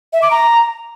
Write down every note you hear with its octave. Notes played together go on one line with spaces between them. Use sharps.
E5
D6
A#5